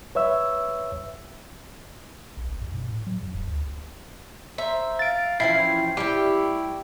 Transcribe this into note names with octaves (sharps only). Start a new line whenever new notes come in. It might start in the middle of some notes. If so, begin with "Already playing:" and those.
B4 C#5 E5 E6
B1
G1
F#2
B2
A2
F#3
F#2
E1
D2
C5 E5 A#5
F5 A6 D7
E3 F3 C#4 E4 G5 C7
G3 A3 E4 G4 G5